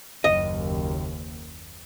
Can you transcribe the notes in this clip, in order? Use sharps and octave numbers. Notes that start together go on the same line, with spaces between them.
F#1 D#2 D#5